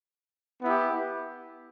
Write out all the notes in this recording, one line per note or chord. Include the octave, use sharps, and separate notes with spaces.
B3 E4 G4